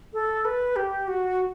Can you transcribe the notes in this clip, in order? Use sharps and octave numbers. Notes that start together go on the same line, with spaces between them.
A4
B4
G4
F#4